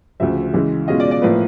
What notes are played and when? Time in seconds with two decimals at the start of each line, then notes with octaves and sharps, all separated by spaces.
0.20 D2 C#3 F3 E5
0.53 C#3 E3 G#3
0.88 B2 G#3 C#4 F4 D#5
1.00 D5
1.11 D5
1.22 A2 F3 A#3 B4